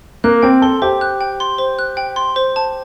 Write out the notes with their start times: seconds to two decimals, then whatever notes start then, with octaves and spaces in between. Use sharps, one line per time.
0.24 A#3 F#6
0.43 C4 G5
0.62 A4 C6
0.82 G4 C5
1.01 F#6
1.21 G5
1.40 C6
1.58 C5
1.79 F#6
1.97 G5
2.16 C6
2.36 C5
2.56 A5